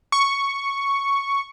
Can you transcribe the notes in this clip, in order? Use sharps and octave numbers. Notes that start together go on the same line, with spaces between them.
C#6